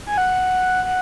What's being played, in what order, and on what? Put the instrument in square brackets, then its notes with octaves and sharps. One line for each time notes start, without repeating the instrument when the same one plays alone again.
[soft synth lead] G#5
F#5
F#5